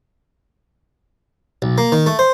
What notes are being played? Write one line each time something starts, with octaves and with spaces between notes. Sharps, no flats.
B1
A#3
D#3
A3
C5